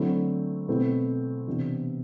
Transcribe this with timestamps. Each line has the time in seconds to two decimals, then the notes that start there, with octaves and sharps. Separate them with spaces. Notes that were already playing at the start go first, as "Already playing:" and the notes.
Already playing: D3 F#3 A3 C4 E4
0.68 B2 A3 C4 E4
1.48 C3 E3 B3 D4